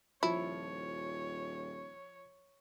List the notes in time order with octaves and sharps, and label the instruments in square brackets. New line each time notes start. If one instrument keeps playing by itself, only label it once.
[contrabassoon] D#1 [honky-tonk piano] F3 [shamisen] E4 [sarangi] C#5